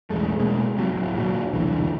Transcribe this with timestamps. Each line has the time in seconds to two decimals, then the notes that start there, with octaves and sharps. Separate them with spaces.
0.10 E1 A1 G#3 A3
0.39 B2 G#3 A#3
0.77 C3 F#3
0.90 D1 G1
1.15 A#2 F#3
1.53 E1 C2 D3 E3